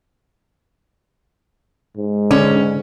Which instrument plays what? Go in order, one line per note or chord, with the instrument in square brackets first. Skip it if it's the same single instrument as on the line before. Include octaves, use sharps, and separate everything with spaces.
[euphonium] G#2
[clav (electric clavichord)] D3 [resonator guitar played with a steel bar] C#4